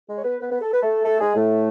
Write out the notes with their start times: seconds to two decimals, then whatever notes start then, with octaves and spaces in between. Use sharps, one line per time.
0.08 G#3 G#4
0.18 C#5
0.24 B3 B4
0.40 B3 B4
0.51 B3 B4
0.61 A4
0.73 B4
0.82 A3 A4
1.05 A3 A4
1.20 G#3 G#4
1.36 A2 A3